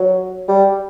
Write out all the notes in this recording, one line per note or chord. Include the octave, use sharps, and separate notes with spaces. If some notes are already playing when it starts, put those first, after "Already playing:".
Already playing: F#3
G3